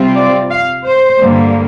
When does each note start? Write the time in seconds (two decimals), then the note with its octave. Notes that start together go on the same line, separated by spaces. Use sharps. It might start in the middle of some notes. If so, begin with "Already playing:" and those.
Already playing: C3 G3 C4 F4
0.17 D5
0.51 F5
0.85 C5
1.20 G2 D3 G3 A#3